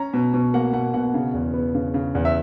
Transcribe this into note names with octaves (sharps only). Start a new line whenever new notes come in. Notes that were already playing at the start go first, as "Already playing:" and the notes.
Already playing: C#4 A#5
B2
B2
A#3 F#5
B2 F#5
B2 F#5
C#3
E2
B3
C#3
C#3
E2
E5